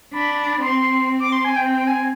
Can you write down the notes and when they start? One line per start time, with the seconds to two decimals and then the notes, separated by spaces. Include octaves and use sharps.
0.13 D4 B5
0.61 C4 C6
1.20 D6
1.32 C6
1.45 G#5
1.56 C4 G5
1.73 G5
1.87 G#5